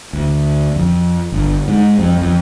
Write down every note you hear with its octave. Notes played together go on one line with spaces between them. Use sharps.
D2
F2
G1
G#2
F2
F2